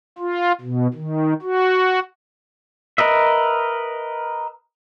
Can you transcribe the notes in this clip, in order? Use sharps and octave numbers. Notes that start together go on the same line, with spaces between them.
F4
B2
D#3
F#4
A#4 B4 D#5 E5